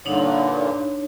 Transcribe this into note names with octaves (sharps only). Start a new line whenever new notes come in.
G2 A#2 D3 D4 D#4 C#5